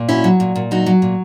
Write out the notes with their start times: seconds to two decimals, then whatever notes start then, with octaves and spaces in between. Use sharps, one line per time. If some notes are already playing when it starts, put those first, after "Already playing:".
Already playing: A#2
0.09 F#3 C#4 E4
0.24 F#3
0.40 A#2
0.55 A#2
0.71 F#3 D#4 F#4
0.86 F#3
1.02 A#2